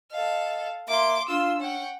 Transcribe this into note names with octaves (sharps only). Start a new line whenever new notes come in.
A4 D#5 F5
A#3 E5 C6 D6
D4 F4 C6 E6
C#4 F#5 G5